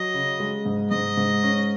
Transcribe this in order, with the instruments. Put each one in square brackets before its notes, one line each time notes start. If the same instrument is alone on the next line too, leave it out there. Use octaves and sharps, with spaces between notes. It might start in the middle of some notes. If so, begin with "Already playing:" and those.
Already playing: [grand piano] F#3 [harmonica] D#5
[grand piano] C#3
G#3
G#2
[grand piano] G#2 [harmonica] D#5
[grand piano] G#2
C#4